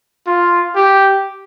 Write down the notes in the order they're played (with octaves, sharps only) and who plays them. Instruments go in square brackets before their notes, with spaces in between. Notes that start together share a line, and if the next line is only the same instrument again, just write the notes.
[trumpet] F4
G4